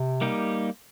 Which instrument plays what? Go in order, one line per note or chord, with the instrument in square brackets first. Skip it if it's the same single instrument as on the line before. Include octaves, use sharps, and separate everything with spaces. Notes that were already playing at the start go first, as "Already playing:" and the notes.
Already playing: [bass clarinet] C3
[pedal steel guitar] G3 A#3 D#4 G4